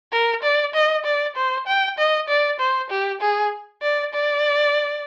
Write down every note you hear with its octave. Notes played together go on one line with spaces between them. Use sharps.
A#4
D5
D#5
D5
C5
G5
D#5
D5
C5
G4
G#4
D5
D5